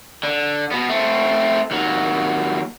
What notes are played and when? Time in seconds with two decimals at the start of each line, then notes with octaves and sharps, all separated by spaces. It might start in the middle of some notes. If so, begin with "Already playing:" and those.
0.23 D3
0.71 B2 B3
0.89 A3 C4
1.71 D#2 F#3